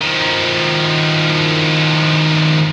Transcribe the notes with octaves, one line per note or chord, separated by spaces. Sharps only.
D#3 F3